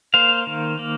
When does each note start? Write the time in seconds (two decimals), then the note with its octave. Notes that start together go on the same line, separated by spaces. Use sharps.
0.14 A#3 C5 F5
0.47 D#3
0.79 A#3